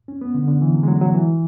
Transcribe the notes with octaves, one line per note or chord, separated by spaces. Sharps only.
C#4
B3
D3
D3
E3
F#3
G#3
F#3
F#3
E3